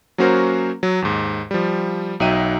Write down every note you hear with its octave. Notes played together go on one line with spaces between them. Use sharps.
F#3 A#3 C#4 F#4 A#4 C5
F#3
D#2 G#2
F3 G3
B1 F#3 D#4 E5 G5 D#7